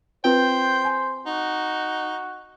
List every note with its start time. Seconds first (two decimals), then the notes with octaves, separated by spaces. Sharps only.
0.25 C4 F4 B4 C5 G5
0.85 G#5
1.26 D#4 F#4